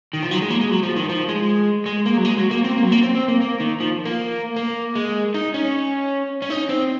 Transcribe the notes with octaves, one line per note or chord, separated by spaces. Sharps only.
D#3
F3
F#3
G#3
A#3
G#3
F#3
F3
D#3
F3
G#3
G#3
A#3
F#3
G#3
F#3
A#3
C4
A#3
F#3
A#3
C4
C4
A#3
A#3
D#3
F3
A#3
A#3
G#3
D#4
C#4
C#4
D#4
C4